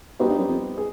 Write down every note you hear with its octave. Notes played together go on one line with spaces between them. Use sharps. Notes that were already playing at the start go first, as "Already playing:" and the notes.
B2 G3 B3 D#4 G4 C5
G2
F#2
F2
G#4 B4